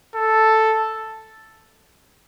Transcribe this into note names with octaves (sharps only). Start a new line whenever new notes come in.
A4